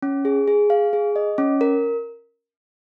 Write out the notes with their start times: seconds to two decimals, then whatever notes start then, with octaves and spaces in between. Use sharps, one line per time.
0.02 C#4
0.25 G#4
0.48 G#4
0.70 F5
0.93 G#4
1.16 D#5
1.38 C#4
1.61 A#4